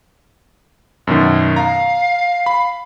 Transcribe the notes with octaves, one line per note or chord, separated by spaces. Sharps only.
F#2 B2 D#3
F5 A#5
B5